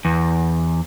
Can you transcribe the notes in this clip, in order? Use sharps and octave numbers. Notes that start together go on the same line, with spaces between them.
E2